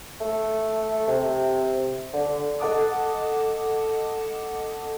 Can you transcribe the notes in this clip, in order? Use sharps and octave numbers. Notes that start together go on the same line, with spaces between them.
A3
C3
D3
A4 D#5 F#5 A5 D6 D#6